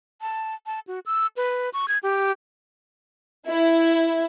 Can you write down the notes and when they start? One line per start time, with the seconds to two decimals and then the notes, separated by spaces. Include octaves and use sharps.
0.21 A5
0.66 A5
0.87 F#4
1.06 E6
1.37 B4
1.74 C#6
1.88 G#6
2.03 G4
3.46 E4